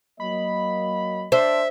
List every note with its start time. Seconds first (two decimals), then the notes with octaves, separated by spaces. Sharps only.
0.20 F#3 A#3 D#5 B5
1.32 D4 C5 E5